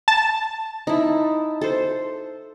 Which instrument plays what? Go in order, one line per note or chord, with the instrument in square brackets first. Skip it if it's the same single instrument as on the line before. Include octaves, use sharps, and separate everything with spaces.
[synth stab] A5
[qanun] D#4 E4
A4 C5